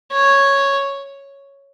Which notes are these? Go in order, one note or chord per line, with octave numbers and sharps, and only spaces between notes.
C#5